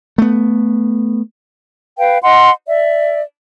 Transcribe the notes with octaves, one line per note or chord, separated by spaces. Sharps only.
A3 B3
B4 F5 G5
D#5 F#5 C6
D5 E5